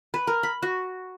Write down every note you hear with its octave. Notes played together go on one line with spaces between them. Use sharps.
B4
A#4
B5
F#4